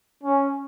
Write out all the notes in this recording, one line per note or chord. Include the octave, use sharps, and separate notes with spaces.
C#4